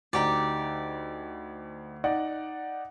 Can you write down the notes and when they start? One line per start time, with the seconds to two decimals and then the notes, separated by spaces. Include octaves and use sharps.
0.13 D2 D#4 G4 D5
2.04 D#4 D5 F#5